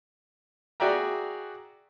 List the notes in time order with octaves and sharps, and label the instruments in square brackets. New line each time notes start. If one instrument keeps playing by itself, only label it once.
[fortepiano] F#4 G#4 D5 E5 G5 A#5